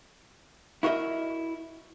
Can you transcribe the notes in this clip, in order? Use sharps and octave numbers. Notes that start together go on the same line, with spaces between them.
E4 F#4 A#4 D#5 E5